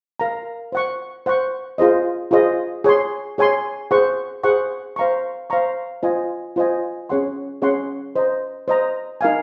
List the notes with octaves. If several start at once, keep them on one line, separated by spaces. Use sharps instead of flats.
A#4 F5 A#5
C5 F#5 C#6
C5 F#5 C#6
F4 G#4 C5 D#5
F4 G#4 C5 D#5
G#4 C#5 G#5 C6
G#4 C#5 G#5 C6
G#4 C5 F#5 C#6
G#4 C5 F#5 C#6
C5 F5 A#5 C#6
C5 F5 A#5 C#6
F4 C5 D#5 G#5
F4 C5 D#5 G#5
C#4 G#4 C#5 F#5 C6
C#4 G#4 C#5 F#5 C6
C5 D#5 A#5
C5 D#5 A#5
D#4 A#4 F5 G#5